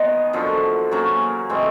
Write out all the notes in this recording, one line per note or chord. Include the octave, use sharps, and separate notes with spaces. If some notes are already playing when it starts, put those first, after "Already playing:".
Already playing: D#3 G#3 B3
F#2 D3 F3
C#3 F#3 A#3 C#4
A2 E3 G#3 C4